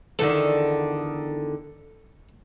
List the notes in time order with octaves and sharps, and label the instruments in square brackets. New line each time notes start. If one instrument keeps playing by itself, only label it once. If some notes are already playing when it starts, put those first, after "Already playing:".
[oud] E2 D3 D#3 [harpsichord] A4